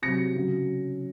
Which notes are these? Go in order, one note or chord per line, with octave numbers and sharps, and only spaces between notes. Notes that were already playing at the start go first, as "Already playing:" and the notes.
C3 F#3 A#6 C#7
C#3 F#3